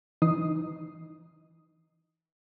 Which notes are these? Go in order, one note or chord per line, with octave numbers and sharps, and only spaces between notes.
E3 D#4 D#6 C7